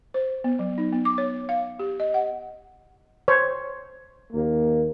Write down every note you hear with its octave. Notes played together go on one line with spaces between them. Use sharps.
C5
B3
F#3
D#4
B3
D6
C#5
F5
G4
D#5
F#5
C5 C#5
D#2 A#3